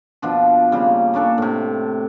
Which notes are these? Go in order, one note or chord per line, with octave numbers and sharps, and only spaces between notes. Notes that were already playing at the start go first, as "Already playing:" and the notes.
B2 F3 D4
C#3 G3 A#3
A#3 C#4 D4 A4
A2 C3